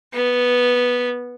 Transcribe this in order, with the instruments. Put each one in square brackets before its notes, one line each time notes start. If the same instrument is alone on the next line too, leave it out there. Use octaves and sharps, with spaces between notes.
[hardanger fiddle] B3